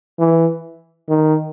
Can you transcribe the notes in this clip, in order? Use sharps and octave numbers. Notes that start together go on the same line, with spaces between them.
E3
D#3